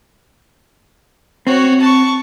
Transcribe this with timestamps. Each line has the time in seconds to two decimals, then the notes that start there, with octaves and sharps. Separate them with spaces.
1.47 C4 F#4 C#5
1.81 A5 C#6